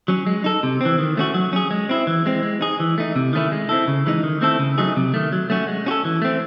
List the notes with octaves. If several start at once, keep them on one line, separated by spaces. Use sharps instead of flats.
F#3 C#4
G#3
D#4 A4
C3
E3 C4
D#3
A3 C#4 F#4
F#3
C#4 G#4
G#3
C4 E4
E3
G#3 C4
G#3
D#4 G#4
E3
A3 D#4
C3
D#3 A3 C#4 E4
G#3
C4 E4 A4
C#3
E3 G#3 D#4
D#3
A3 C4 E4 A4
C#3
F#3 A3 D#4 G#4
C3
D#3 A3
F#3
A3 C#4 F#4
G#3
C#4 F#4 A4
E3
A3 C4